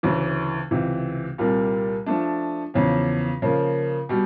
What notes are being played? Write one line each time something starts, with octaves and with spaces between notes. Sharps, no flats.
D2 C#3 E3
C#2 C3 E3
C2 A#2 G3 A#3
F3 A3 D4
E2 C#3 F3
C#3 F3 A#3
B2 G3